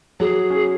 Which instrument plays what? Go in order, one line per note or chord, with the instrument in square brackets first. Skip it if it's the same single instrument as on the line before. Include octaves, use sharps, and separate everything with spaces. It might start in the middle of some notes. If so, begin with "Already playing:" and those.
[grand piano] F#3 [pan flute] G#4
[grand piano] C#4